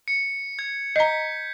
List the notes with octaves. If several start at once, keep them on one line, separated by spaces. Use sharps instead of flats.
C#7
G#6
D#5 A#5 G6 B6